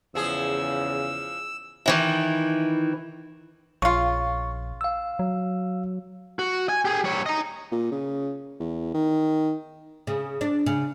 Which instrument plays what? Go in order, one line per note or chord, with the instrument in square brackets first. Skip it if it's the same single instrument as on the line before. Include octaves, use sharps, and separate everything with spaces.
[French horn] E2 [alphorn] C#3 [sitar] F3 G#4 [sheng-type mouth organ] E6
[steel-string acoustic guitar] D#3 E3 E4
[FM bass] A#1 [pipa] C#3 F4 [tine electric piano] C#6
[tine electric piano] F5 E6
[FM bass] F#3
[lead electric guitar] F#4
G#5
G4 G#4
G3 C#5
D#5 A#5
[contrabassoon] A#2
C#3
E2
D#3
[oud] C#3
D4
C#3